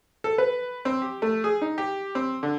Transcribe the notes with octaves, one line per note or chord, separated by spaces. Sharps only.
A4
B4
C4
G4
A3
G#4
D#4
G4
C4
D3